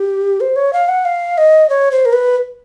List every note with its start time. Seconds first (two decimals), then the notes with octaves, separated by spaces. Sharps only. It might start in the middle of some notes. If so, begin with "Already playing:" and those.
Already playing: G4
0.40 C5
0.56 C#5
0.73 F5
0.88 F#5
1.05 F5
1.38 D#5
1.69 C#5
1.91 C5
2.05 A#4
2.13 B4